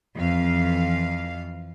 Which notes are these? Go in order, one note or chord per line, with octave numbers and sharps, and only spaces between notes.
F2 E3 F5